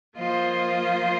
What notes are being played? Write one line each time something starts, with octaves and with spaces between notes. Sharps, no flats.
F3 A#3 F4 C5 D#5